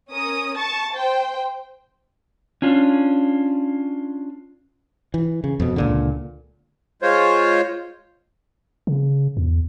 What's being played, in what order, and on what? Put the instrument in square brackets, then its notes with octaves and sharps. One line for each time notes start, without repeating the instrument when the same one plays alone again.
[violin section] C#4 A#4 D#6
A5 C#6 A6
C5 G5
[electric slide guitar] C#4 D4 F4
[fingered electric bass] E3
C#3
F2 B2
C#2 A#2 D3
[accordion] G#3 F4 C5 C#5
[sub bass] C#3
E2